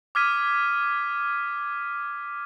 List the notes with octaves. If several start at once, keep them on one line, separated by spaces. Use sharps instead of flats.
D6 D#6 F6 G#6 B6 D#7